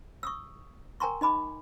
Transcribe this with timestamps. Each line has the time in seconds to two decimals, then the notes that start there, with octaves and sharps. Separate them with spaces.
0.23 C#6 D#6 E6
1.00 A#4 G5 G#5 A#5 C6 C#6
1.21 D#4 D#5 B5 D6